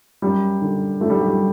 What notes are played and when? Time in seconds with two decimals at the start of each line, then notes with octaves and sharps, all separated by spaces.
0.22 F#2 G3
0.62 D3
1.01 F#2 A3
1.10 G3
1.19 F#3
1.28 G3